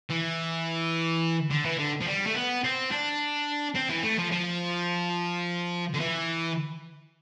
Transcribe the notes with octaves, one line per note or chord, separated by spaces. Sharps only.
E3
D3
E3
D3
F3
G3
A3
B3
C4
D4
C4
E3
A3
F3
F3
D3
E3